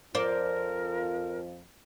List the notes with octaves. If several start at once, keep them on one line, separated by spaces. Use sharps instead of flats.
F2 F3 A#4 C5 D5